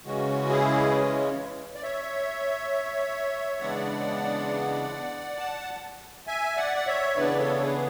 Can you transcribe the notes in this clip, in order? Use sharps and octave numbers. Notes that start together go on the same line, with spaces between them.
C#3 E3 G#3 C#4 F#4
E4 G#4
D5
C#5 E5
C#3 E3 G#3 B3 D4 D5 F#5
F#5 A5
E5 G#5
D5 F#5
F#5
C#5 E5
C#3 E3 B3 D4 B4 D5
A4 C#5
G#4 B4